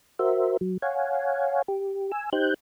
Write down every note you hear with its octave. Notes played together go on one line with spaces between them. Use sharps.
F#4 A#4 C5 E5
F#3
C#5 F5 F#5 G#5
G4
G#5 E6
D#4 G4 C5 F#6 G6